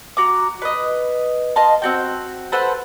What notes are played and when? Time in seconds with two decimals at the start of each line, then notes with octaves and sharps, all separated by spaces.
0.17 F#4 A#5 D6
0.62 B4 D#5
1.56 D#5 F5 A5 C6
1.82 C4 F#4 G5
2.52 A4 B4 C5 F#5